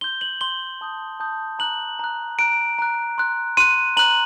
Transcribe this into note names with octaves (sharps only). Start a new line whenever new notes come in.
C6 G6 G7
F#7
C6 G6 G7
A5 D#6 G6
A5 D#6 G6
A#5 F#6 F#7
A#5 F#6
A#5 F#6 D7
A#5 F#6
C6 F#6
C6 F#6 D#7
A#5 F#6 F#7